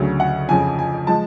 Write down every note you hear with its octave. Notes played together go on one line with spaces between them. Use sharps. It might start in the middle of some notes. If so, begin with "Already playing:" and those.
Already playing: D2 C#3 F#3
F#5
F2 C#3 F3 G#5
G#5
F3 G#3 A5